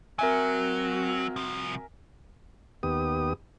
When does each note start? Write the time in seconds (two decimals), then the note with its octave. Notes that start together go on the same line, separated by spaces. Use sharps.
0.19 F#3 C4 F#4 A#4 E5 G#5
1.36 C2 F3
2.83 D#2 B3 G4 D#6